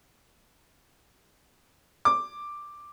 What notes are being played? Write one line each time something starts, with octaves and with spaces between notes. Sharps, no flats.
D6